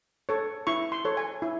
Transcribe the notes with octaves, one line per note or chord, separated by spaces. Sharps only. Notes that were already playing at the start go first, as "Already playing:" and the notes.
A4 C#5
E4 C#6
C6
A4 C#5
G#5
E4